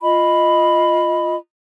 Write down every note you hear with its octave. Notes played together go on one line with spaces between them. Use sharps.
F4 D#5 B5